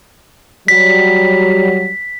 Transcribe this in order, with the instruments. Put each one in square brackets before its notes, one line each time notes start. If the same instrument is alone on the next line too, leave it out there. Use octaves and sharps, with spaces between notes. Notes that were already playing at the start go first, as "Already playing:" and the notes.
[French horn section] F#3 G3 [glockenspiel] B6